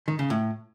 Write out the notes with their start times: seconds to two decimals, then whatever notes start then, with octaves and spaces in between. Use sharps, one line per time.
0.08 D#3
0.19 C#3
0.30 A2